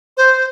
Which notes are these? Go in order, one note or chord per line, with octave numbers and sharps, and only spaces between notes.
C5